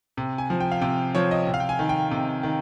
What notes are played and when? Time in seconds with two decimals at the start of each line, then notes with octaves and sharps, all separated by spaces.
0.17 C3
0.38 G#5
0.50 F3
0.60 G5
0.71 F5
0.81 C3 G5
1.15 F3 C#5
1.31 D#5
1.47 C3
1.54 F5
1.60 G5
1.69 G#5
1.79 D#3
1.89 G5
2.11 C3
2.43 D#3